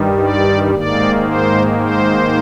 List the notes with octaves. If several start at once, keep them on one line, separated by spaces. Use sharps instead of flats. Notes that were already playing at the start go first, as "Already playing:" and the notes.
Already playing: G2 D#3 G3
D5
G#2 D#3 A#3 D5
C5
C5